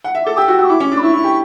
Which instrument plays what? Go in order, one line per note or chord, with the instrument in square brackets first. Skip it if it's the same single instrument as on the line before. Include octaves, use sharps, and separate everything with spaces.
[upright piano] F#5
E5
[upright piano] A4 [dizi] D6
[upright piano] G4 [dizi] E6
[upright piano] F#4
F#4
[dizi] C#6
[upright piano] E4 [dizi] D6
[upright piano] C#4
D4
[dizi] B5
[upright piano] E4 [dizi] C#6
[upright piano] E4
G4